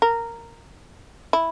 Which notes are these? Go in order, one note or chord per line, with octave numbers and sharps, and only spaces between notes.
A#4
E4